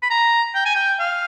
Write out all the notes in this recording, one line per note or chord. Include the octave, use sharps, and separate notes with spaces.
B5
A#5
G5
G#5
G5
F5